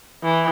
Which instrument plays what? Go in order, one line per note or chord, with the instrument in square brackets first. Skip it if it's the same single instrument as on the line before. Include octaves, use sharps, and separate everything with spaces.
[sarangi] E3